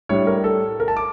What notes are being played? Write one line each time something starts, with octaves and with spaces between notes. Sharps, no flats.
A2 G3 D4 C#5
A#4
A4
A#4
A5
D6